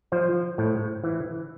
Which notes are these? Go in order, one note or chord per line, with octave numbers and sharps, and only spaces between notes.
F3 C5
A2
E3